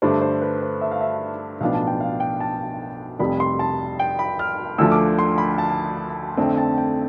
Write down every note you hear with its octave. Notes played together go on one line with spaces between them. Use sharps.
G2 D3 A3 D4 C5
C5
B4
C5
E5
F5
E5
B1 A2 F3 B3 D4 F5
A5
G5
F5
G5
A5
F1 F2 C3 G3 B5
C6
A5
G5
B5
F6
D2 D3 F3 A3 E6
D6
C6
B5
A5
F2 D3 A3 C4
A5
G5